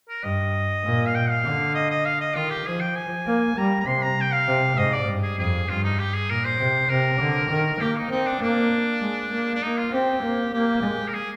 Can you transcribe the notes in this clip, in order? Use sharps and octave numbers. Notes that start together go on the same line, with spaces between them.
A#4
G2 D#5
A#2
F5
G5
F5
D3
D#5
D#5
F5
D#5
D#3 F4
G4
F3 G#4
G5
G#5
A#3
G3 A#5
A#5
C3 C6
A#5
G5
F5
C3
G#2 D#5
D5
G2
G#4
F2 G#4
G2 F4
D#4
G4
G#4
A#2 A#4
C5
C3
C3 A#4
D3
D#3
A#3 G4
D#4
C4 D#4
D4
A#3 D4
G#3
A#3
D4
A#3 D#4
F4
C4 G4
A#3
A#3 G4
G#3
A#4
G#4